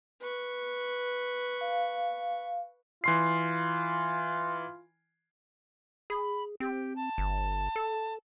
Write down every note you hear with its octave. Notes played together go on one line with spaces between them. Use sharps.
B4 C#6
F5
E3 F4 C6 C7
G#4 B5
C4 G4
A5
G1
A4